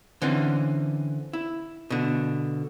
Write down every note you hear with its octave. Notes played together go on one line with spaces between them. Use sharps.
D3 E3 C4 C#4
E4
B2 D3